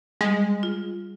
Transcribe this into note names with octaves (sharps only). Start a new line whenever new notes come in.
G3 G#3
F4